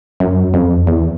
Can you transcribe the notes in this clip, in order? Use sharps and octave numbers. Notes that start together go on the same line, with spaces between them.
F#2
F2
E2